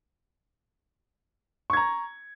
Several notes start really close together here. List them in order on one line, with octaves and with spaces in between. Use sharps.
C#6 G#6 A#5